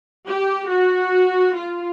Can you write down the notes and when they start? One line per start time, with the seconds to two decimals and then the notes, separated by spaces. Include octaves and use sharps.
0.28 G4
0.70 F#4
1.55 F4